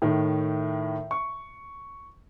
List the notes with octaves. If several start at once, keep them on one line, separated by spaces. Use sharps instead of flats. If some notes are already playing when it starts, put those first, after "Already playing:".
A2 D#3
C#6